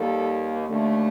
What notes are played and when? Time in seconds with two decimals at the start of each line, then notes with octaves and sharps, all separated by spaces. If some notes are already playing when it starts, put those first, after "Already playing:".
Already playing: D#2 D#3 G3 A#3 A4
0.68 D#2 D3 A3